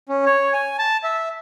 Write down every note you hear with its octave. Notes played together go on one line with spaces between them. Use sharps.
C#4
C#5
G#5
A5
E5